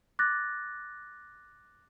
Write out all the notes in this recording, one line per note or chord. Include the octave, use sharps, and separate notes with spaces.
D6 F#6 A6 A#6